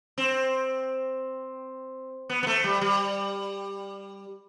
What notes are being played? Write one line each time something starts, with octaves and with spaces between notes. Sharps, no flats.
C4
B3
B3
A3
G3
G3